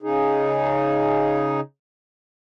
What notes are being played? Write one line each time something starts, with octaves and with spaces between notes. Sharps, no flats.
C#3 D#4 G#4